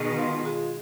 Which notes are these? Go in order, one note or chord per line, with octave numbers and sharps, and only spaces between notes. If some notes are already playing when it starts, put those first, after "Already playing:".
Already playing: B2 D#3 G#3
F4
G#3